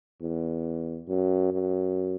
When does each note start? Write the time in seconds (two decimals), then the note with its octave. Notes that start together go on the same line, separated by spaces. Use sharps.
0.22 E2
1.09 F#2
1.53 F#2